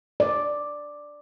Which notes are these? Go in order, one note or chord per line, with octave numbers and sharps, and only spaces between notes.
D5